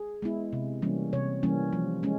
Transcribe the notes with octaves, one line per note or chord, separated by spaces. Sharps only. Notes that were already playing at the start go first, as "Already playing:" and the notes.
Already playing: G#4
G#3 B3 E4
C3
E3 G3 A#3 C#4
C3 C#5
E3 G3 A#3 C#4
F3
G#3 C#4